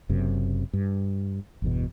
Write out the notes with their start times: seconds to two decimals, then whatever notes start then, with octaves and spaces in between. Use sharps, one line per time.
0.09 F#1 F#2 C3
0.73 G2
1.62 G1 E2 B2